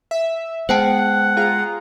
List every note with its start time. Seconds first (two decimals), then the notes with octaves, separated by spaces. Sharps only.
0.11 E5
0.69 G#3 B3 C5 F#5 G5 A5
1.37 F4 G#4 A#5